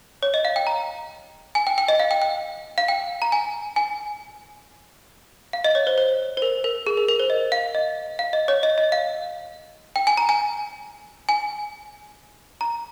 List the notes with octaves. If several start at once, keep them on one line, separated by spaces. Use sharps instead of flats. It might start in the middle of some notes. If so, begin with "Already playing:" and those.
C#5
D#5
F5
G5
A#5
G#5
G5
G5
D#5
F5
G5
G5
F5
G5
A#5
G#5
G#5
F5
D#5
C#5
C5
C5
C5
A#4
A#4
G#4
A#4
A#4
C5
D#5
F5
D#5
F5
D#5
C#5
D#5
D#5
F5
G5
G#5
A#5
G#5
G#5
A#5